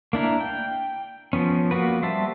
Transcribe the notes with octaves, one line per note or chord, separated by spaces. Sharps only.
A#3 D4 E4 A#4
G5
F3 B3 C#4
A#3 B3 F#4 B4
G3 C5 E5 A5